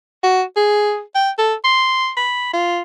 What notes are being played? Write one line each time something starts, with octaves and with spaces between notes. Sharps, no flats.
F#4
G#4
G5
A4
C6
B5
F4